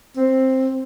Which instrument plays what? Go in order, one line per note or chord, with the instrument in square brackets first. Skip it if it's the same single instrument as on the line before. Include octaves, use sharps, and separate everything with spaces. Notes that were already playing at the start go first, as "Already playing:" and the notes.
[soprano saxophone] C4